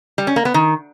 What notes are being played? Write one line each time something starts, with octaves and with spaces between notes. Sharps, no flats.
G3
C#4
A#3
B3
D#3